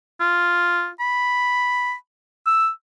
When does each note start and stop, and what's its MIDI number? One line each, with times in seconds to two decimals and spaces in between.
0.20 0.89 65
1.00 1.94 83
2.46 2.69 88